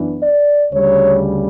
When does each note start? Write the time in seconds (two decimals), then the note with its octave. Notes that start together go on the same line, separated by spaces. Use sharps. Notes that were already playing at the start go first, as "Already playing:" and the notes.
Already playing: F#2 E3 B3 D4
0.21 D5
0.73 D2 C#3 G3 C#5